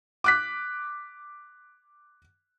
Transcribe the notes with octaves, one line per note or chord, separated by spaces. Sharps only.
D6 F#6 B6